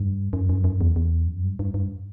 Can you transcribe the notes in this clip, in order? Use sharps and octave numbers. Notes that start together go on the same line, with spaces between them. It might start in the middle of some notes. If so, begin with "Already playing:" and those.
Already playing: G2
F#2
F#2
F#2
E2
E2
F#2
G2
G2
G2